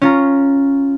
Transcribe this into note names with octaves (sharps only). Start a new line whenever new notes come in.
C#4 F4 A#5